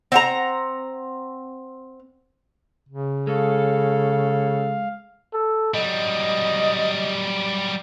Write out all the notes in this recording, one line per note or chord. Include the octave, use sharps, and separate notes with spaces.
C4 F#5 A#5
C#3
G#3 A4 C#5 F5
A4
F#3 G3 D#5